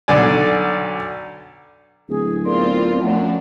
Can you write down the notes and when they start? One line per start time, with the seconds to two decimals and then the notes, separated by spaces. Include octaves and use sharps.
0.08 B1 D3 D5 G#5
2.09 D1 G#4
2.46 B3 C4 F4 A#4 D5 C6
3.01 F#2 F3 A3 D4 F#5